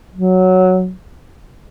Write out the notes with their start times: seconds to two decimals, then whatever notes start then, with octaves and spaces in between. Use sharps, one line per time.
0.14 F#3